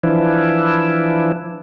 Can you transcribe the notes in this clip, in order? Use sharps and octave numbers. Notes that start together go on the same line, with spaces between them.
E3 F3 D4 E4